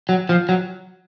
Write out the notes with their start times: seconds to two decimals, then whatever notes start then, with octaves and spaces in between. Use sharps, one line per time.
0.09 F#3
0.29 F3
0.49 F#3